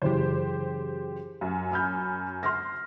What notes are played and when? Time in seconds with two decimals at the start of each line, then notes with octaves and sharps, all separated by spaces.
0.02 F#2 C#3 E3 G4 C5
1.41 F#2
1.71 B5 F6 G6
2.43 C6 F6 A#6